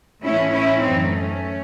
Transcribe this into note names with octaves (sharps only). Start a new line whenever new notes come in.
A2 E3 C#4 E4
C#4 E4
F#2 E3 C4 D#4
A3 C#4